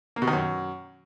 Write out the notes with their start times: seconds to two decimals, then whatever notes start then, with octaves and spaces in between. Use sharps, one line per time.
0.16 A#3
0.22 B2
0.27 D#3
0.33 F#2